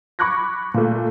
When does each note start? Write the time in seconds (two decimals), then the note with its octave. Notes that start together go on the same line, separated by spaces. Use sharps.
0.19 B5 C#6 D6 F#6 G#6 A#6
0.74 A#2 A3